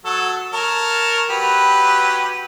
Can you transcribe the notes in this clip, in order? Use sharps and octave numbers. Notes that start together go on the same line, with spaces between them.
F#3 A4
A#4 C#5 A5
F#3 G4 B4